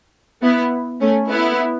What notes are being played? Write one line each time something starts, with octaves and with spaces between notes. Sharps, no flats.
B3 E4
A3 C#4
B3 E4